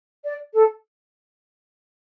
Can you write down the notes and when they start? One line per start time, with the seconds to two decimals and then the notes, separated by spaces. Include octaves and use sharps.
0.24 D5
0.54 A4